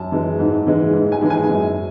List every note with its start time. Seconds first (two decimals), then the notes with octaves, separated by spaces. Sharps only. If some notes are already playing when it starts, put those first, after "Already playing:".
Already playing: F#2 A5
0.12 E3 G#3
0.39 G#2
0.66 E3 G#3
0.93 G#2
1.12 G#5
1.21 E3 G#3
1.30 G#5
1.49 F#2